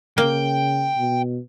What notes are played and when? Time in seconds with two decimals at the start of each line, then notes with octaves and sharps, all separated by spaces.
0.18 C#3 A#3 G5
0.97 B2